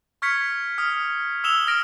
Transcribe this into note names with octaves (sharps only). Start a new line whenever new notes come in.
C#6 F6 G#6 B6 C#7
D#6 F6
D#6 E6 E7 F7 G7
D#6 F6 A#6 D7